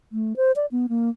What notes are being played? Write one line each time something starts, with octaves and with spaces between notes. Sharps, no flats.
A3
C5
D5
B3
A#3